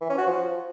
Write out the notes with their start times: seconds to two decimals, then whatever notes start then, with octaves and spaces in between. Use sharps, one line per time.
0.01 E3
0.10 C#4
0.18 F#4
0.27 F3